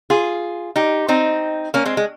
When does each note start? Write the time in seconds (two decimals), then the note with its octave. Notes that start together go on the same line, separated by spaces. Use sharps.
0.10 F4 G#4
0.76 D#4 G4
1.08 C4 D#4
1.74 A#3 C#4
1.85 G#3 C4
1.97 G#3